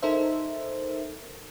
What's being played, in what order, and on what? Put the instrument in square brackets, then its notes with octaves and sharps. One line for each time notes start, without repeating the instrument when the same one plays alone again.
[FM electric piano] D#4 A4 A#4 C5 E5